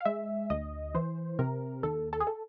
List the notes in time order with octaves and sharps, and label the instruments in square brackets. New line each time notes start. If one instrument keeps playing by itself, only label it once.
[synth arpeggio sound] F5
G#3 E5
D2 D#5
E3 C5
C3 A#4
D#2 A4
A4
G#4
A4